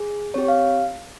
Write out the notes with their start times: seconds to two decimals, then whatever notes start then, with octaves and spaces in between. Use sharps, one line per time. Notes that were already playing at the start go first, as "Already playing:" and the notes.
Already playing: G#4
0.34 C4 G4 C#5
0.48 F5